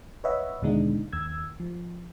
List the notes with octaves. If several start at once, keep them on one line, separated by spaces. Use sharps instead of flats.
B4 C#5 D#5 E5 F#5
D#2 B2 D3 G#3 D4 D#4
D#2 E6 G#6
F3